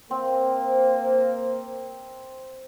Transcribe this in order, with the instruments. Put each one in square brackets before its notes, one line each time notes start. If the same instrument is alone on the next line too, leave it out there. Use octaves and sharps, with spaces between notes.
[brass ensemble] A#3 C5 [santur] C4